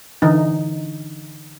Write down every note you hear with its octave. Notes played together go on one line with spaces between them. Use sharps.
D3 E3 D#4